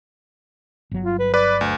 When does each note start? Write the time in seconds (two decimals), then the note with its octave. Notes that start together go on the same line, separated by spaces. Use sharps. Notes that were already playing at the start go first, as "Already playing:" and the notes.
0.91 G1 F#3
1.04 F4
1.19 B4
1.34 B4 D5
1.61 D2